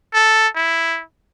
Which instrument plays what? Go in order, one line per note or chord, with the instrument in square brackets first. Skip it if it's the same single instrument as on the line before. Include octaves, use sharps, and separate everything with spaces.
[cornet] A4
E4